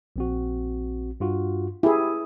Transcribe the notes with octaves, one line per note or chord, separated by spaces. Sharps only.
A#1 C4 F#4
G2 F4 F#4
E4 G4 G#4